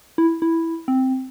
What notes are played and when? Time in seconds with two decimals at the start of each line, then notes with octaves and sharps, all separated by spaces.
0.18 E4
0.42 E4
0.88 C4